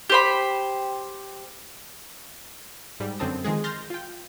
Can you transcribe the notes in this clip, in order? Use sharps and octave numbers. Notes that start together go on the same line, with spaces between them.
G4 C5 B5
G#2 G3
F#2 D3 C4 A5 D#6
D#3 F3 G#3 G#4
C6 F6 G6 A6 A#6
F4 G5